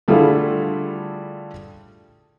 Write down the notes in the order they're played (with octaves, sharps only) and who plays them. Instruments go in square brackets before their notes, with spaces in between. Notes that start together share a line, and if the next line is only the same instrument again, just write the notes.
[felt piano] D3 G3 A3 E4 F4 G#4